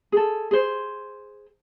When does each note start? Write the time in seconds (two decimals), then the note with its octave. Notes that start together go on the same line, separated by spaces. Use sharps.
0.12 G#4 A4
0.51 G#4 C5